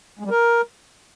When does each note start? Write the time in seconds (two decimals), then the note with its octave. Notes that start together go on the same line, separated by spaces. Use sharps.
0.19 G#3
0.25 G3
0.31 A#4